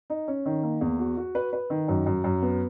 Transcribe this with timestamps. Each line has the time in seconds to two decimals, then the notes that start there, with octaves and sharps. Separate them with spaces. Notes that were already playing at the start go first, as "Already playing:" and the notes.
0.10 D#4
0.28 C#4
0.46 D#3
0.63 A#3
0.81 E2
0.99 F#4
1.17 F#4
1.35 B4
1.53 B4
1.70 D#3
1.88 F#2
2.06 F#2
2.24 F#2
2.42 B3